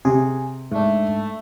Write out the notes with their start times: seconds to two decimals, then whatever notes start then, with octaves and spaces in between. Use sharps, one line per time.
0.05 C3 G#4
0.71 G#2 A3 D4